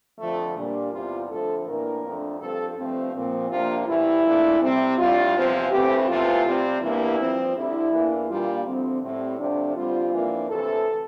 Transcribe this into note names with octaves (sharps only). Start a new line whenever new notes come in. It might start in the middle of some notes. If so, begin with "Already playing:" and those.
F2 D3 F3 A3
A#2 G3 D4
E2 C3 G3 F4
F2 D3 F3 A3 A4
A2 E3 A#3 D4 A#4
F2 D3 A3 D4
G2 F3 C4 A4
G2 F3 A3 C4
A#2 F3 C4
C3 F3 A#3 D4 F4
A2 E3 G3 E4
A#2 A3 D4
C3 G3 C4
A2 G3 D4 F4
E2 C3 F3 C4
G2 E3 A3 C4 G4
E2 C3 E3 A3 F4
C3 G3 C4
E2 E3 G3 A#3 D4 E4
G2 F3 C4
D2 D3 G3 E4
E2 E3 A#3 D4
A#2 G3 A#3 D4 F4
D2 D3 F3 C4
A2 G3 C4
C3 F3 A3 D4
G2 D3 G3 C4 F4
F2 E3 A#3 D4
D2 C3 E3 A4